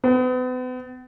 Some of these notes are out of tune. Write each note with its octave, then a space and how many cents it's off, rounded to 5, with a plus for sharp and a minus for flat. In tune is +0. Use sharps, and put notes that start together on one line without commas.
B3 +40